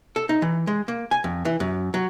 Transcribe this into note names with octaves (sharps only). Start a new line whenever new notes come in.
A4
D#4
E3
G#3
A#3
G#5
F2
E3
F#2
F#3